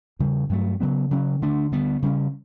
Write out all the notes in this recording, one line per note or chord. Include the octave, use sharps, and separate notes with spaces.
E2 C#3 G3
G2 F#3 A3
C#3 F#3 B3
C#3 F#3 C#4
D2 D3 A3 D4
D2 D3 G3 B3
C#3 G3 C#4